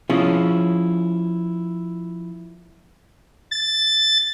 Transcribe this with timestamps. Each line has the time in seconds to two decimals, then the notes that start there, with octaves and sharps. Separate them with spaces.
0.10 F3 C#4 E4 F4 G#4
3.51 A6